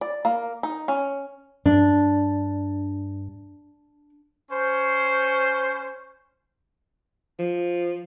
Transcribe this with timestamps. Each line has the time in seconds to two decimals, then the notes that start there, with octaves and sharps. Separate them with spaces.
0.01 D5
0.25 A#3
0.63 D#4
0.88 C#4
1.66 G2 D4
4.50 C#4 C5
7.39 F3